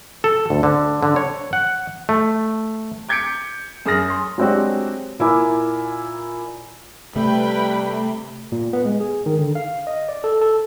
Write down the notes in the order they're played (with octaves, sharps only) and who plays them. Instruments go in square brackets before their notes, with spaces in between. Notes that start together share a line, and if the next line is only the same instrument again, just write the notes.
[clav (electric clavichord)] A4
D2
D3
D3
C#5
F#5
A3
[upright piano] D6 G6 G#6 B6 C#7 D7
F#2 G#4 D#6 F6 A#6
C6
F#3 G#3 C4 D4 F#4 G4
A#2 E4 A#4 G#5 D6
[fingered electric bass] C3 [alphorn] G3 [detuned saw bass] A3 [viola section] B4 G5 B5
[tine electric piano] A#2
B3
G#3
G#4
D#3
D3
F5
D#5
D5
A4
A4